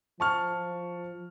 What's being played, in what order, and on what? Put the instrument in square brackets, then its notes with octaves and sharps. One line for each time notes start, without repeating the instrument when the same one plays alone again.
[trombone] F3 [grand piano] A5 C#6 F6